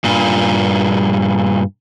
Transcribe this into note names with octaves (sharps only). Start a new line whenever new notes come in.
G2 A#2